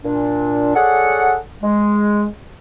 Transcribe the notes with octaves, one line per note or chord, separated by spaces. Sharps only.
A#2 D4
G#4 A4 C#5 D5 F#5
G#3